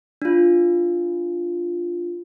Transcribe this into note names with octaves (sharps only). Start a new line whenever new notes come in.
D4 F4